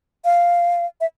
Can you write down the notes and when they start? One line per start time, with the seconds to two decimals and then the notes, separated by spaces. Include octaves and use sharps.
0.25 F5
1.01 E5